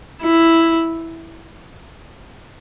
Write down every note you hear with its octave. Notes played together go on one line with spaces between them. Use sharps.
E4